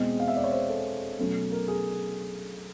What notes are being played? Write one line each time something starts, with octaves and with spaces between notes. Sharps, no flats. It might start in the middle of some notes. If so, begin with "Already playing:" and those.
Already playing: E2 B2 G#3 C4 D#5
F5
E5
D5
C#5
C5
A4
B2 F#3 A3 C#4
A#4
G#4